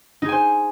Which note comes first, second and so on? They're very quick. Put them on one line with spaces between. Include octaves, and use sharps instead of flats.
D#4 G#4 G#5 C5